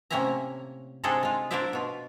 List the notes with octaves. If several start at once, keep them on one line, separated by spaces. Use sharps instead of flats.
A2 C3 A#3 C#4 E5 A#5
C3 G#3 D4 D#4 G#4 A4
G#3 F4
D4 E4 A#4 C5 D5 E5
B2 F4